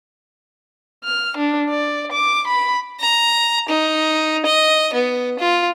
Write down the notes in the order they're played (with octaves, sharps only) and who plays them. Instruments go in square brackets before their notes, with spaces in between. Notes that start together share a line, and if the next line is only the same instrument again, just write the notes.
[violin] F6
D4
D5
D6
B5
[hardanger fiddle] A#5
D#4
D#5
B3
F4